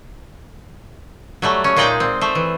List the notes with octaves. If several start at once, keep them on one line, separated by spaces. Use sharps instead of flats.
F#3 G3 A3
C#4
A#2 G#3 D#4 D5 G5
C4
A3 C5
E3